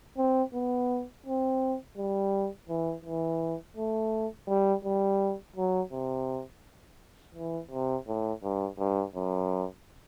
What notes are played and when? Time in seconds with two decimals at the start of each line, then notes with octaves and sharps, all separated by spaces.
0.18 C4
0.54 B3
1.27 C4
1.98 G3
2.69 E3
3.05 E3
3.77 A3
4.49 G3
4.85 G3
5.56 F#3
5.92 C3
7.35 E3
7.71 C3
8.08 A2
8.43 G2
8.79 G2
9.15 F#2